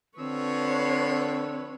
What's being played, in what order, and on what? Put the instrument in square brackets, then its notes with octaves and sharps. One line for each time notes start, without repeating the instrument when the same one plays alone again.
[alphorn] D3 [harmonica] F3 E6 [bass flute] C4 [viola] B4 C#5